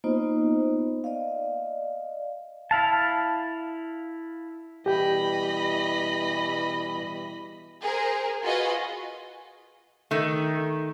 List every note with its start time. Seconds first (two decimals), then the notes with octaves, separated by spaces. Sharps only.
0.04 A#3 B3 D#4 F4 C5 D#5
1.04 D5 D#5 F5
2.71 E4 F5 A5
4.86 B2 E3 G3 G4 D#5 G5 B5
7.81 G#4 A#4 C5
8.44 F4 F#4 G#4 B4 D#5
10.11 D#3 A3